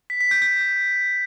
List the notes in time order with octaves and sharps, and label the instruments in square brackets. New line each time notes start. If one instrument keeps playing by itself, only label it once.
[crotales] B6
B6
G6
G6